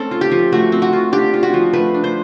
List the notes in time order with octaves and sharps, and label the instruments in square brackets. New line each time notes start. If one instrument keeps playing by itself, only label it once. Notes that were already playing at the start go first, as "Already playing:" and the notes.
Already playing: [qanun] A3 C4 C#4 A4
F4
G4
F3
A3 F#4
C4
F#4
F4
D4 G4
F4
F#4
F3
A3 B4
D4
C5